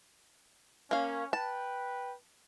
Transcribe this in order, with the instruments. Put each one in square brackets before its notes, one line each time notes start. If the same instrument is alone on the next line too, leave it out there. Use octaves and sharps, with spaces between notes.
[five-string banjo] A#3 F5 [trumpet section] C#4
[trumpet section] B4 G5 [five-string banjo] A5